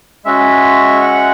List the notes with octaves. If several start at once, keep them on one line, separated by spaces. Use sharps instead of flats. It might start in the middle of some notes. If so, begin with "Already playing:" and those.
G#3 C#4 F#4 E5
F#5